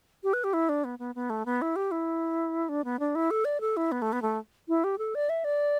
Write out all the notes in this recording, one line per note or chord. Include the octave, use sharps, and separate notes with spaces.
G4
B4
G4
E4
D4
B3
B3
B3
A3
B3
E4
G4
E4
D4
B3
D4
E4
A4
D5
A4
E4
B3
A3
B3
A3
E4
G4
A4
D5
E5
D5